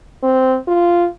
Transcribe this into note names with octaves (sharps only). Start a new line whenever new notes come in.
C4
F4